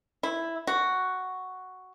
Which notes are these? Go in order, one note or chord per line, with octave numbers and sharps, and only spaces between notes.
E4
F#4